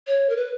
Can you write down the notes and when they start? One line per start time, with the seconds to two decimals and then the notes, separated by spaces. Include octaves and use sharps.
0.07 C#5
0.29 A#4
0.37 B4